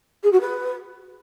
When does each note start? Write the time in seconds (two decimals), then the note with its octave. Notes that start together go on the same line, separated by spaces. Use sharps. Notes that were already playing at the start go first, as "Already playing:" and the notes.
0.23 G#4
0.32 F#4
0.41 B4